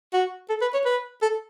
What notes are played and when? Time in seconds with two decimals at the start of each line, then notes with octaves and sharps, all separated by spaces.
0.13 F#4
0.50 A4
0.62 B4
0.74 C#5
0.85 B4
1.22 A4